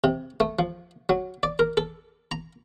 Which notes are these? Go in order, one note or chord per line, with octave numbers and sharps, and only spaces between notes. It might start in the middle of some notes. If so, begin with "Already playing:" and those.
C3
A3
F3
F#3
D5
A#4
A4
A#5